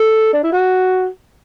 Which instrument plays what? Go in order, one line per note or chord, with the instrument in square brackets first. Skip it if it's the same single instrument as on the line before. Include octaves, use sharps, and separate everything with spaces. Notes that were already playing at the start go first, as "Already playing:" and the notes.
Already playing: [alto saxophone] A4
D4
E4
F#4